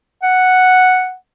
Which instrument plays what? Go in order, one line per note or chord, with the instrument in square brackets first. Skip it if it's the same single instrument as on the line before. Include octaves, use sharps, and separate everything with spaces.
[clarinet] F#5